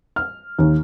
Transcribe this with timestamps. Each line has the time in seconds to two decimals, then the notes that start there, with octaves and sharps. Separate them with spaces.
0.16 F6
0.59 D#2